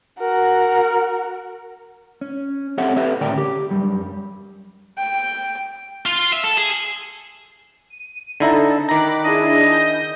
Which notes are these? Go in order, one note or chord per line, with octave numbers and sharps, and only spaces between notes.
F#4 A#4
C#4
C4 G4 A4 C#5 E5 F#5
G4 A4 B4 C#5 E5
A2 D3 C#4 A#4 D5 G5
G4
F#2 A#2 G3
G5
F4
E5
A4
G#4
D#7
D3 D#4 E4 A4 A#5
D#3 A#5 B5 D6 F#6
D4 E4 G#4 D#5
G6 A#6